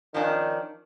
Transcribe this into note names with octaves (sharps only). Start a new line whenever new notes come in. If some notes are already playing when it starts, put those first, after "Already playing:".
D#3 F3 C#4 D4